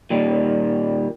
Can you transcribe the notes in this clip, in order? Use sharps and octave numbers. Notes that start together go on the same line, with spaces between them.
A#2 D#3 G3